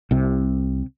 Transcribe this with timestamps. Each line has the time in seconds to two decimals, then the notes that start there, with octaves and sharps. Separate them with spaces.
0.11 C2 C3